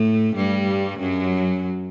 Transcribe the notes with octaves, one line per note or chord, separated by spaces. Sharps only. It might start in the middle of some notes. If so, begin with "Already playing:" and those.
Already playing: A2 A3
G2 G3
F#2 F#3